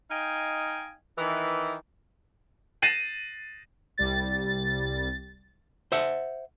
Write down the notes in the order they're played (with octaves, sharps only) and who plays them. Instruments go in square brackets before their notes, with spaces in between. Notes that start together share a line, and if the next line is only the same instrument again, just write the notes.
[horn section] D#4 D#5 F5 G5 G#5
D#3 E3
[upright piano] A6 A#6 C7 D#7 E7 F#7
[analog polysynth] C2 G3 A6
[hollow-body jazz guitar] C5 E5 F#5